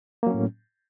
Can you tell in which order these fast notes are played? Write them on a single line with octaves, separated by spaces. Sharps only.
A#3 F#3 C#4 A2